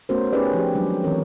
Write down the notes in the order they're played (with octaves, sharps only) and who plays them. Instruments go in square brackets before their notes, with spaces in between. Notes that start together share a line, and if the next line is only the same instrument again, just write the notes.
[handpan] A3 B3 C#4 F#4 A#4 C5
C#4 D#4 G4 G#4 B4 D5
F3 G4
D#3 F#3 G#3 D4
D#3 E3 C4 A#4 C#5